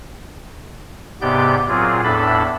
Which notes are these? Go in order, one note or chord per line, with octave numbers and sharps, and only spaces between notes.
G#2 C3 B3 G4 D5 G6
A#2 F#3 C4 F4 G#4
E2 A2 D4 A4 A5 B5